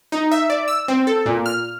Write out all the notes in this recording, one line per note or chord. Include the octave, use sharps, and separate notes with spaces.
D#4
E5
D5
E6
C4
A4
A#2
F6